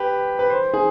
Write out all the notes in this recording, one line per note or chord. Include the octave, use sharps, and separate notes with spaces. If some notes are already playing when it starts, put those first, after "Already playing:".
Already playing: G4 B4
B4
C5
G#4